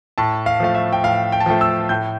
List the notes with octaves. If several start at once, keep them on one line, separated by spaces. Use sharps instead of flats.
A2 A5
F5
F3 A3 F5
E5
G5
A2 F5
G5
A5
F3 A3 G5
E6
A2 G6